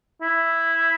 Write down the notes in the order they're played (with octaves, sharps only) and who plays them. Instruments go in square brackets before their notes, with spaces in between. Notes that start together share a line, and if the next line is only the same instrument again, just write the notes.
[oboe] E4